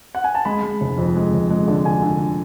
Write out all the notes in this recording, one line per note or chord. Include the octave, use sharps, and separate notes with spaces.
F#5
G#5
A5
G#3 B5
G#3
F1
F2
G#3
F1
G#3
D3
D3 G#5
D3